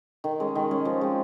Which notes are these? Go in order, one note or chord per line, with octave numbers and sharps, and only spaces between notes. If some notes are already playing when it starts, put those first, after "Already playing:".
D#3
G#3 C#4
D#3
G#3 C#4
F3
G#3 C4